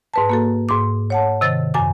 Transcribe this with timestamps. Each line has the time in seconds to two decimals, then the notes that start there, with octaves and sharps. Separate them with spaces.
0.14 G#2 B4 A5
0.30 A#3 F#4 A4
0.69 G#2 C6 D6
1.10 C#5 F#5 A5
1.41 C3 D#3 A6
1.74 F#2 G#5 D6